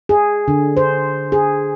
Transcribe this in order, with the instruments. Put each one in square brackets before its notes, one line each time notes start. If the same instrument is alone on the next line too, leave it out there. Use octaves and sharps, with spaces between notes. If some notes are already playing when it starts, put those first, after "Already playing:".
[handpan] G#4
D3
C5
G#4